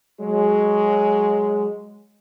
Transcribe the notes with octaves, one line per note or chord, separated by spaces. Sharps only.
F#3 G#3